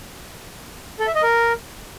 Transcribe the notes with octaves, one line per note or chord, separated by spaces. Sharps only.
A4
E5
D#5
A#4